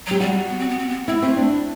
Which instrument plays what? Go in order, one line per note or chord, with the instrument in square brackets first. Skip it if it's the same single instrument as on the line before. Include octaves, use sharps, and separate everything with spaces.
[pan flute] F#3 [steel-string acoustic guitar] G4
[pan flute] G3 [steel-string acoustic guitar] F#4
[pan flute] B3
C4
B3
C4
B3
[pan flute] C4 [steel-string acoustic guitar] E4
[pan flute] A3 [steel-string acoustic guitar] C4
[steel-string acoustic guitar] D4